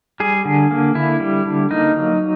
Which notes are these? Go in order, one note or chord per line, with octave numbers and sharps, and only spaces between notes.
G3 G#4
D3
A#3
D3 E4
G3
D3
A#3 D#4
F#3